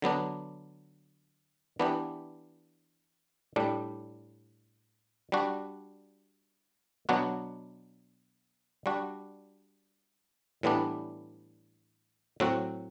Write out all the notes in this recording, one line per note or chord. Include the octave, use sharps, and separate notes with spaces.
D3 F#3 B3 D4
E3 B3 D4 G4
A2 G3 D4
G3 D4 F#4
B2 F#3 B3 D4 F#4
G3 D4 F#4
A2 E3 G3 B3 D4
A2 F#3 C4 F#4